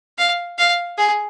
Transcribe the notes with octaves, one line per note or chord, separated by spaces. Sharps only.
F5
F5
G#4